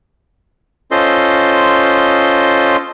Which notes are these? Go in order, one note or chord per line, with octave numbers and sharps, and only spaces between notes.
C#4 F4 A4 C5 D#5 C6